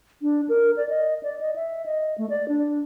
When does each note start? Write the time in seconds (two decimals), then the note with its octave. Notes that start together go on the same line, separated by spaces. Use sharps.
0.22 D4
0.49 A#4
0.77 D5
0.89 D#5
1.23 D5
1.41 D#5
1.56 E5
1.86 D#5
2.18 A3
2.30 D5
2.48 D4